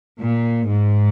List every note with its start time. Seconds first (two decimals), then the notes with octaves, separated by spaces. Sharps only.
0.20 A#2
0.67 G#2